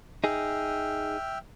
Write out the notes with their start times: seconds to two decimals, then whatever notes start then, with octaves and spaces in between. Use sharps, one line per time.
0.24 D#4 G#4 E5 G5 F6